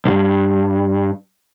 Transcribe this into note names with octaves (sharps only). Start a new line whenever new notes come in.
B1 G2